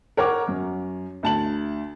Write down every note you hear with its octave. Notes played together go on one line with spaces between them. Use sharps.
A#4 C#5 F#5 A#5 D6
F#2
D2 A5 F#7